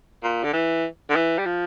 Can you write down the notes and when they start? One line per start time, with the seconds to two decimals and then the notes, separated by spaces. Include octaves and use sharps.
0.23 A#2
0.44 D3
0.53 E3
1.10 D3
1.15 E3
1.38 G3
1.46 F3